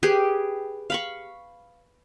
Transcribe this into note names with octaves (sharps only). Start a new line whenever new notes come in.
G4 G#4 B4
F5 B5 C#6